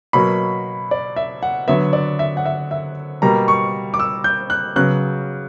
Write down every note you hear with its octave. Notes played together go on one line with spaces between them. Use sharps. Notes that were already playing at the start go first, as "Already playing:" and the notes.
B2 F#3 A#3 B5
D5
E5
F#5
D3 F#3 B3 E5
D5
E5
F#5
E5
E5
B2 G3 A#3 A#5
C#6
D6
E6
G6
F#6
C#3 F#3 B3 F#6